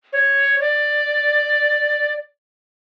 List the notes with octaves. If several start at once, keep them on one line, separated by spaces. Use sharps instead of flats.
C#5
D5